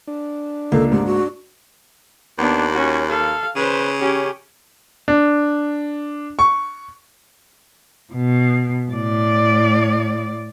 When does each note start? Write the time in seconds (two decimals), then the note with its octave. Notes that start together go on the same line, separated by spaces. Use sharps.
0.07 D4
0.72 C#2 A#3 A4
0.92 G#2 G4
1.06 F#4
2.38 D#2 B3 D4
2.72 C#4 F#4
3.09 A4 F5
3.56 C#3 B4 C5
3.99 C#4 G4
5.08 D4
6.39 C#6
8.13 B2
8.90 A2 D5